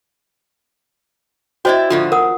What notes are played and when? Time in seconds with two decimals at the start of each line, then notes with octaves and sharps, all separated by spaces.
1.65 E4 F#4 C5 D5 D#5 G5
1.90 A2 D3 F3 F4
2.12 E2 A#4 F#5 D#6